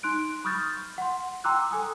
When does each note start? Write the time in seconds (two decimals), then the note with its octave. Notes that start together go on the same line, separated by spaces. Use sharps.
0.03 D#4 C6 F#6 D7
0.44 B5 C#6 D#6 F6 G6 A6
0.98 F#5 C6
1.44 G5 A#5 C6 D6 E6 F#6
1.71 A4 G#5 D#6